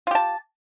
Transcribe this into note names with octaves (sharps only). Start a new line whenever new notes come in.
F4 G4 A5